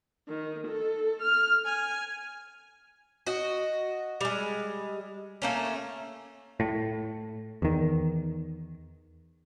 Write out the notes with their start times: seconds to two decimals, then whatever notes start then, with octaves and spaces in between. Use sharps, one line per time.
0.27 D#3
0.67 A4
1.21 F6
1.65 G#5
3.26 F#4 D#5
4.21 G3 G#3
5.42 A3 A#3 C#4
6.60 A2
7.62 E2 D#3